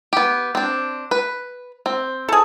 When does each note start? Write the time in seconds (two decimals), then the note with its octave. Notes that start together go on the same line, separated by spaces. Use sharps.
0.13 B3 G4
0.55 C4 D4
1.11 B4
1.86 C4
2.29 G#4 A4